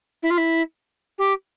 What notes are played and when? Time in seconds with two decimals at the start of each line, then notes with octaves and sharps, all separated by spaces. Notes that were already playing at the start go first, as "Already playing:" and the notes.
0.22 E4
0.30 F4
0.37 E4
1.18 G4